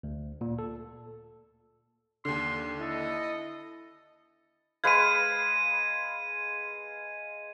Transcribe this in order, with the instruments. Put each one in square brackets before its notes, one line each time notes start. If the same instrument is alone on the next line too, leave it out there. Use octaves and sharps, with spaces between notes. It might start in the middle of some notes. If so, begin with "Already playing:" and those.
[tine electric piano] D2
A#2
A4
[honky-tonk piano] D#2 D3 [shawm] C6
[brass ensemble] E4 D#5 [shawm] A4
[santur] G#3 B4 F5 [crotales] G#6 D#7